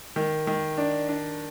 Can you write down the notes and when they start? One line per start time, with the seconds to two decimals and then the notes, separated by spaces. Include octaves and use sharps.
0.16 D#3
0.47 D#3
0.78 D4
1.09 D4